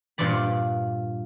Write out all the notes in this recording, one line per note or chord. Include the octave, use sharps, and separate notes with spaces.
G2 A#2 F4 D5 B5